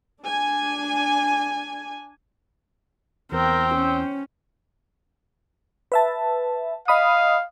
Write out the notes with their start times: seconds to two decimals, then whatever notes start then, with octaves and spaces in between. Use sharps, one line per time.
0.24 D4 G#5
3.32 E2 C4 A#4 C5 G5
3.75 C#4
5.92 B4 E5 A5
6.88 D#5 F5 B5 D#6